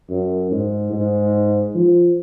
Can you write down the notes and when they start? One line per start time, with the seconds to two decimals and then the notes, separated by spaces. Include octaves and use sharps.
0.10 F#2
0.51 G#2
0.92 G#2
1.75 F3